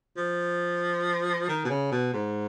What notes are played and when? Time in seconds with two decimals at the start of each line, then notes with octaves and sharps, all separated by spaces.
0.17 F3
1.48 D#3
1.64 B2
1.69 C#3
1.92 B2
2.13 G#2